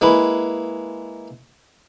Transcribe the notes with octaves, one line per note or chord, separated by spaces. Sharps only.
G#3 A#3 E4 B4